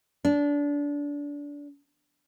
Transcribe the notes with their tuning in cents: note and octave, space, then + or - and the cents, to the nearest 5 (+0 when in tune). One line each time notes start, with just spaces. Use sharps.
D4 -25